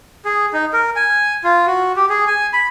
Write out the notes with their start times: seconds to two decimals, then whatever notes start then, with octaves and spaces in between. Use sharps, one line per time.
0.25 G#4
0.53 D#4
0.73 A#4
0.96 G#5
1.44 F4
1.67 F#4
1.96 G4
2.09 G#4
2.27 G#5
2.53 B5